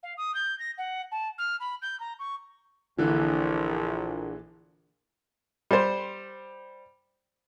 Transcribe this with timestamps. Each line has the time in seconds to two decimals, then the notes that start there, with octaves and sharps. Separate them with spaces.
0.03 F5
0.17 D#6
0.34 G6
0.59 A#6
0.78 F#5
1.12 A5
1.38 F6
1.60 B5
1.82 G6
2.00 A#5
2.19 C#6
2.98 A#1 D3 E3
5.71 G3 C5